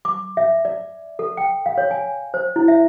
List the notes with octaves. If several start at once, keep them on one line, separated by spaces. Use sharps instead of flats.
D6
E5
D5
A4
G5
F5
C#5
G#5
C5
E4
E5